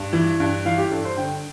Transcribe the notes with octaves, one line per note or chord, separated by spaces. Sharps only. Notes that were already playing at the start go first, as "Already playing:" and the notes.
Already playing: G2
E3
G2
E3 F5
G4
G2 A4
C5
D3 G5